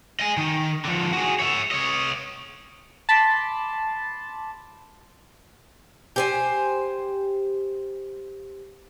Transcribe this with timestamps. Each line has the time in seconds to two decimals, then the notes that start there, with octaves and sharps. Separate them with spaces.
0.20 D#5 G#5
0.37 D#3
0.85 D3 F3
1.13 F#4 G#4
1.39 C#5 E5
1.71 C#5 D#5
3.09 A5 B5 C6 D6
6.16 G4 C5 G#5